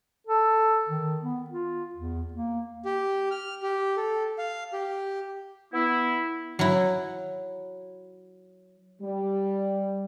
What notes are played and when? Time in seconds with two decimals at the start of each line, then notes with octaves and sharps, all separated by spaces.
0.27 A4
0.89 D#3
1.21 B3
1.50 F4
1.95 E2
2.33 A#3
2.85 G4
3.31 F6
3.63 G4
3.97 A4
4.38 F5
4.73 G4
5.74 B3 E4
6.59 F#3 E4
9.02 G3